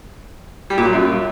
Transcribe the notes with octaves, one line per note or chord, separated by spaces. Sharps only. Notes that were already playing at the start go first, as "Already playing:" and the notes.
G3
A#2
F#3
F#2